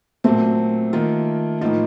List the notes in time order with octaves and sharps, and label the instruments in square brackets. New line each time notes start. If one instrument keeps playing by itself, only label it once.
[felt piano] A#2 F#3 C4 [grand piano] A3
[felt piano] D#3 A#3 F4
[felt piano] A2 F3 A#3 F4 [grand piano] D#4